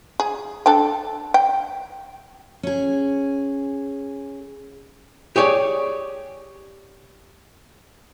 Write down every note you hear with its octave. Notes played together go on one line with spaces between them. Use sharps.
G#4
D4 A4 G5
G5
C#4 G#4
G4 G#4 C#5 D5